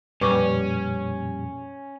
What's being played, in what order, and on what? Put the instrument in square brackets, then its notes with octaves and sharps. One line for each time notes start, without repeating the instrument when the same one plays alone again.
[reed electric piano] F2 A#2 [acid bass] G3 [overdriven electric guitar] C#4 [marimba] B4 C#6 D6